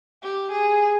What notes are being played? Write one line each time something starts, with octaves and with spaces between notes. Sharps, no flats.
G4
G#4